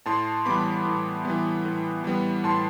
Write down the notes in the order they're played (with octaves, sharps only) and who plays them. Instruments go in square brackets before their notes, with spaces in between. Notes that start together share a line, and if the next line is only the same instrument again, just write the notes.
[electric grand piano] A2 A5 C6
E3 G3 B3 B5 D6
A2
E3 G3 B3
A2
E3 G3 B3
A2 A5 C6